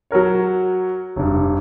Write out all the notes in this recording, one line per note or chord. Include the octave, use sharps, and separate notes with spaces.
F#3 F#4 A#4 C#5
F1 G2